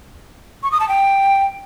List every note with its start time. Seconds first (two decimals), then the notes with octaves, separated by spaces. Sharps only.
0.63 C#6
0.72 D#6
0.80 A5
0.89 G5